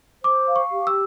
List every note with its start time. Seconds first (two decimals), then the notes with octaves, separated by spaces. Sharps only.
0.24 C5 D6
0.48 F5
0.56 C#6
0.71 G4
0.87 E6